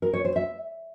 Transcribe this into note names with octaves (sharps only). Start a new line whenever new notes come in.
A#4
C#5
C5
E5